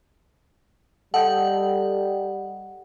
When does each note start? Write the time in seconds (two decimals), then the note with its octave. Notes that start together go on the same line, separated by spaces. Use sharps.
1.14 G3 A4 D#5 F#5 G5